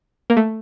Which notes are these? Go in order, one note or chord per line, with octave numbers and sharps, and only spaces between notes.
A#3
A3